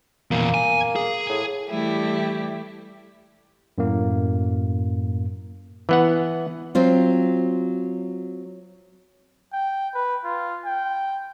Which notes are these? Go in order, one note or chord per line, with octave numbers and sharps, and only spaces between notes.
E2 A#2 A#3
G#5
G#4
A2
E3 G3 A3 E4 G4
F#2 A2 A#3
E3 B3 F#5
F#3 C4 F4
G5
B4
F4
G5